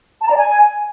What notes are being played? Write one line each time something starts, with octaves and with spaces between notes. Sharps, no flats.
A5
A#5
D5
G#5